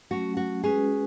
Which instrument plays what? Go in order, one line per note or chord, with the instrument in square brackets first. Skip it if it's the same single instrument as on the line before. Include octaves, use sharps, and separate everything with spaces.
[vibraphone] F#3 A3 C#4 [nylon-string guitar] F#4
[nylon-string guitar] F#4
[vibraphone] G#3 C#4 F#4 B4 [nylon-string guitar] G#4